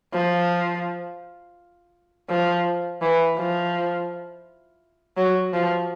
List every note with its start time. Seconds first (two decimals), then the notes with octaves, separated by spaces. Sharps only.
0.13 F3
2.29 F3
3.01 E3
3.37 F3
5.17 F#3
5.54 F3